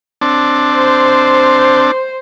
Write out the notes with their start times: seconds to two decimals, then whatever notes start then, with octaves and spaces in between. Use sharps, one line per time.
0.21 C4 D4 A5
0.73 C5